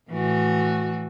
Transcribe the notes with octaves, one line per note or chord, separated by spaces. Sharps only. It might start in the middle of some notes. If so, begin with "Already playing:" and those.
A2 E3 F#4